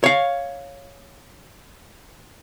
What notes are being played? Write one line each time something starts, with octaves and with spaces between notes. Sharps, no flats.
C#5 F5